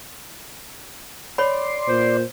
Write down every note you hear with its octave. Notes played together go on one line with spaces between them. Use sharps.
C#5 D5 B5 C6
A#2 C5